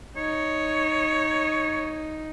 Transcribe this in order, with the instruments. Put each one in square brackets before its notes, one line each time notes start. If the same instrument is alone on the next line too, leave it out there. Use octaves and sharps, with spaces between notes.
[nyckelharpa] D#4 [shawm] C#5